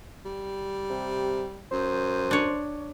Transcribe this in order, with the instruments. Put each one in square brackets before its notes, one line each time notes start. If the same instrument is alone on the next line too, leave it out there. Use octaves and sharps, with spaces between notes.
[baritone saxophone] G3
[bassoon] C3
[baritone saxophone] F#2 [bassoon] C5
[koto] D4 C#5